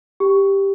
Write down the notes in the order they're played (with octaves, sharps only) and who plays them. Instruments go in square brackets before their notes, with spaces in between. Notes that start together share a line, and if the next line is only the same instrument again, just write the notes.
[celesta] G4